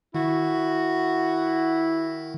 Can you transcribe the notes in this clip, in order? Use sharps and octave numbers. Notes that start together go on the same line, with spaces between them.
D#3 E4 F#4